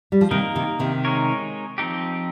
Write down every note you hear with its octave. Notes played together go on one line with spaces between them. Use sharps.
G3
F3
C3 D#3 A#3 D#4 A#4
C3 D#3
C3 D#3
G#3 D#4 A#4 C#5
F3 C4 D#4 G4